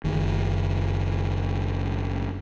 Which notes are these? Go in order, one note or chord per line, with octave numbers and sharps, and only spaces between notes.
F#1 D#3